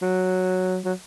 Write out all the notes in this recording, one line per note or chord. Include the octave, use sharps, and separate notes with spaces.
F#3
F#3